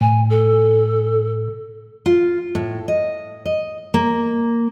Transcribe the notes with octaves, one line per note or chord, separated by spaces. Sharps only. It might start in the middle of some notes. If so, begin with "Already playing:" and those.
A2 G#5
A4
F4
A2
D#5
D#5
A#3